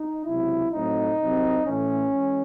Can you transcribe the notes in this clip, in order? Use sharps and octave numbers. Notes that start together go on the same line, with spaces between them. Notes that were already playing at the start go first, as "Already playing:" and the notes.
Already playing: D#4
C#2 C3 F#3 E4
A2 F#3 A3 C4 D#4
C2 C3 F#3 C4
A2 E3 A3 C#4
E3 G#3